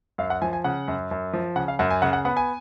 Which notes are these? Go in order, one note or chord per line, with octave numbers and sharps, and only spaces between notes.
F#2 F5
F#5
F3 G#5
G#5
C#3 F#5
F#2
F#2
F3
C#3 F#5
F5
F#2 F#5
G#5
C#3 F#5
F#5
B3 F#5
G#5